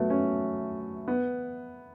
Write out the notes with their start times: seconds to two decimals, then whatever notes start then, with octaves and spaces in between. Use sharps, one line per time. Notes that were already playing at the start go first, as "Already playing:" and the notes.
Already playing: F#3 A3 B3
0.10 C#4
1.08 B3